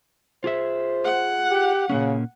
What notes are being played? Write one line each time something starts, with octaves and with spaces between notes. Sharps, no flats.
F4 G#4 C5 E5
F#5
G4
A#2 C#3 A#3 C#4